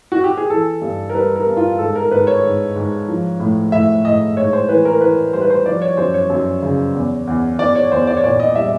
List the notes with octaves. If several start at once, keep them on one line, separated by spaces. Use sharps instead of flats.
F#4
G4
G#4
E3 A4
G2
A#4
G3 B4
A#4
G2
F4
G#2 A4
A#4
G#2 B4
C#5
G#2
G#2
F3
A2
A2 E5
A2 D#5
G#2 C#5
C5
E3 B4
A#4
E3 B4
G3 C5
B4
C5
F3 D5
C#5
F#2 C5
C#5
F#2
C#3
E2
E2
E2 D5
C#5
E2 C5
D5
C#5
A#2 D5
D#5
G3 E5